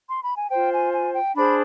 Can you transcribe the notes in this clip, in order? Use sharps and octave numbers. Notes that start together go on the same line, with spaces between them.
C6
B5
G#5
F4 C5 G5
G#5
G#5
G5
D4 G#4 C5 B5